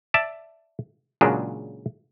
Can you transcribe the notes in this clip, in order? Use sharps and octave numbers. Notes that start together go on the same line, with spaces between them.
D5 E5 A5
A#2 C#3 F#3 G#3 D4